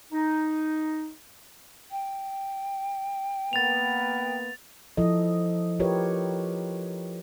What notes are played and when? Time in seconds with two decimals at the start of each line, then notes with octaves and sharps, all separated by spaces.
0.12 D#4
1.91 G5
3.53 A#3 B3 A6 F7
4.97 F3 E4 A4 D#5
5.80 F4 G4 A#4 B4 C#5